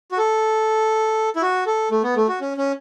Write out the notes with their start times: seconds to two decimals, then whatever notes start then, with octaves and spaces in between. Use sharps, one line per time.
0.12 F#4
0.18 A4
1.36 E4
1.42 F#4
1.66 A4
1.91 A3
2.03 B3
2.16 A3
2.28 F#4
2.41 C#4
2.57 C#4